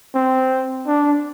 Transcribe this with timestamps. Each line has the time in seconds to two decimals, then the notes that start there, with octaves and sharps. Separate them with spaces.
0.14 C4
0.87 D4